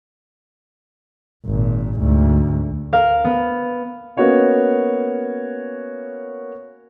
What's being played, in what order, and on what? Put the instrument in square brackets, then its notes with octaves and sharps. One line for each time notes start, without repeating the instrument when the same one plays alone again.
[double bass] G#1 A#2
D2 G#2
[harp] A#4 F5
B3
[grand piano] A#3 B3 C#4 F#4 C#5 D#5